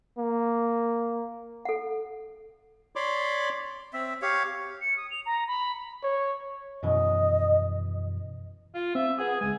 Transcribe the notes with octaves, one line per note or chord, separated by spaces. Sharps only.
A#3
A4 F#5
C#5 D5 B5 C6 D6
C4 E5
G4 C#5 F5
C#7
D#6
F7
A#5
B5
C#5
F#2 B2 E3 D#5
F4
C4 E5
G#4 B4 F#5 D#6
C#2 G#3 G#5